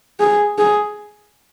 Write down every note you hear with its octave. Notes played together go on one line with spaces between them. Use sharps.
G#4
G#4